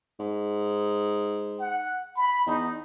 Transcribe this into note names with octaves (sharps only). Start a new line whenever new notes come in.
G#2
F#5
B5
E2 D#4